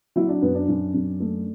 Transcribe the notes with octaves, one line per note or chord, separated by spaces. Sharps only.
F#3 E4
D4
F#2 B3
D4
F#2
F#2
A3